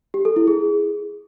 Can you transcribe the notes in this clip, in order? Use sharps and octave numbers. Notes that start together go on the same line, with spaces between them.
G4
A4
E4
G#4